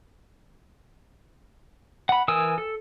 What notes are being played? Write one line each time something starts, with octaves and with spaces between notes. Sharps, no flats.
F#5 B5
E3 A#4 G#5 D#6 E6
A4